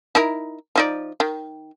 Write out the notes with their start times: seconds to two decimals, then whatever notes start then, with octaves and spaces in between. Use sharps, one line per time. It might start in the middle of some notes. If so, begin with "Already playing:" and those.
0.15 D#4 E4 A#4
0.76 F3 D#4 D5
1.20 D#3